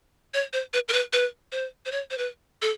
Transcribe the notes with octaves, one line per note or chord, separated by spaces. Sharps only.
C#5
C5
B4
A#4
B4
B4
C5
C5
C#5
C5
B4
A4